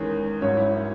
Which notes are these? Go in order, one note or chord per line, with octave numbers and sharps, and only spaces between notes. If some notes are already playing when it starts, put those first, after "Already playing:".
Already playing: E2 D#3 G#3 C#4
G#1 G#2 F#3 C#4 C#5
E4
C#4